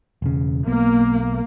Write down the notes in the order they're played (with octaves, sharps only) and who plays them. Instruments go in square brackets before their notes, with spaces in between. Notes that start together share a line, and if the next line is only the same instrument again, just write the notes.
[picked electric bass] E1 C#3
[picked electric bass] B1 B3 [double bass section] A#3